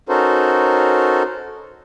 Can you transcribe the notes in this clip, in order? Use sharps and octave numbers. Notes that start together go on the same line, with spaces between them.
C#4 D#4 F#4 A4 A#4 C5